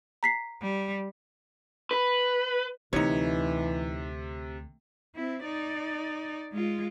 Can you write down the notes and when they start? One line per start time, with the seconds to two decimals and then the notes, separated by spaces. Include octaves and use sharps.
0.23 A#5 B6 C7
0.62 G3
1.91 B4
2.93 D2 C3 E3 D#4 C#5
5.15 C4 E4
5.45 D#4 D5
6.52 G#3 F4